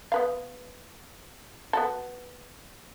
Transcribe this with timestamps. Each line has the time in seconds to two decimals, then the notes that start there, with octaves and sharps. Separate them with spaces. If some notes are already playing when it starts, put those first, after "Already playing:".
0.12 B3 B4 F5
1.73 B3 F#4 A4